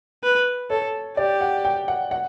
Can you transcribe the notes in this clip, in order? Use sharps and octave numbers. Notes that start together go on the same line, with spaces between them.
B4
A4 C#5
G4 D5
F#5
G5
F#5
F#5